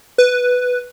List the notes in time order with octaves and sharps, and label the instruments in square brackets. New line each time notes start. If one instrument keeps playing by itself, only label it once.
[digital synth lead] B4